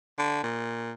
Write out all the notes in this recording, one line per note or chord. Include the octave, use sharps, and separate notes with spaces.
D3
A#2